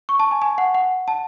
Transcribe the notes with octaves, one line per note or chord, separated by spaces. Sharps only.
C#6
A5
G#5
G#5
F#5
F#5
A5